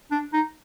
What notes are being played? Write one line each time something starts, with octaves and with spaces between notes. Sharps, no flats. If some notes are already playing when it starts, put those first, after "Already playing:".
D4
D#4